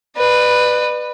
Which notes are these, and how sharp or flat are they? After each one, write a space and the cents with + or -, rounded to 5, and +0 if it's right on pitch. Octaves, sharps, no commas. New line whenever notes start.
B4 +0 D5 +40